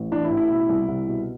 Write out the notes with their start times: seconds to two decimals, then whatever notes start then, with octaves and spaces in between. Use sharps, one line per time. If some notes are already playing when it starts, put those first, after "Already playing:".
Already playing: A1
0.11 E3 D4
0.24 E4
0.30 A1
0.37 E4
0.50 B2
0.69 C2
0.88 C2
1.07 B2